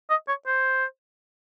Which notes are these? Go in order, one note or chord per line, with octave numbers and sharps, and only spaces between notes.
D#5
C#5
C5